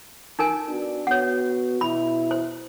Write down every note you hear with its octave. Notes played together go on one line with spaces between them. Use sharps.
D#4 A#4 G#5
B3 D4 F#4
B3 F#4 C#5 F#5
B2 E4 B5
C5